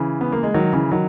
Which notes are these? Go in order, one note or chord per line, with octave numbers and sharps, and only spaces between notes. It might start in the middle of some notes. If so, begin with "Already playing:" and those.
Already playing: C#3 E3
B3
A#3
G#3
D#3 F#3
C#3 E3
D#3 F#3